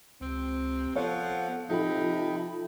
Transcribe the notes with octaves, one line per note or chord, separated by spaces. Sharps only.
C#2 C3 C4
F3 B3 A4 C#5 F5 F#5
C3 F3 D#4 A4 E5 G5 B5